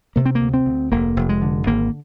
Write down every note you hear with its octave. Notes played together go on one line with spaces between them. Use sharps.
C3 A#3
C4
A#3
D2
C4
D2
F1 A#3
F1
G#3
D3
G#1 A#3